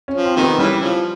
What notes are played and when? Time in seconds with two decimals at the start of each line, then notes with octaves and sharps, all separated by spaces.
0.08 C#4
0.14 F3
0.26 C4
0.36 C3 D#3 A#3
0.42 B3
0.59 C#3 E3 G3
0.81 C#3 F3